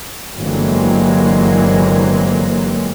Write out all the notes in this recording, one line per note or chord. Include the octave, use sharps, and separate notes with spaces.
G1 E3 F#3 G#3 A#3 C4